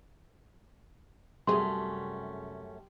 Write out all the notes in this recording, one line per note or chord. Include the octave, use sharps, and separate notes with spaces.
F#2 C3 G3 A3 C#4 G#4 C6